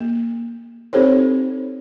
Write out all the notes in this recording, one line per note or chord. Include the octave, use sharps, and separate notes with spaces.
A#3
C4 D#4 G4 A4 C5 C#5